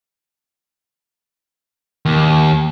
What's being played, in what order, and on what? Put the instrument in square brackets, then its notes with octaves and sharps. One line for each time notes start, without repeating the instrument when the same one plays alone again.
[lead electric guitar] D#2